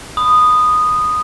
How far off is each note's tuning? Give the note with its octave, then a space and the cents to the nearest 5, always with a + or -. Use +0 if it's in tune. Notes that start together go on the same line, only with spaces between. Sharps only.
B5 +30 D#6 -10